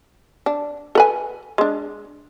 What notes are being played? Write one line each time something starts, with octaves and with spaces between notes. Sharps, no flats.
D4
A4 B4 G#5
G#3 D4